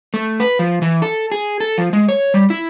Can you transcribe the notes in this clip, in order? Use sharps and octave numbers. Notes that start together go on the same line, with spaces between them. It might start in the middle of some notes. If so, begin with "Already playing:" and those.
A3
B4
F3
E3
A4
G#4
A4
F3
G#3
C#5
G3
E4